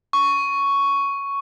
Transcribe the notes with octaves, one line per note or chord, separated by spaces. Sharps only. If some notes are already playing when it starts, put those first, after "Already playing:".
C#6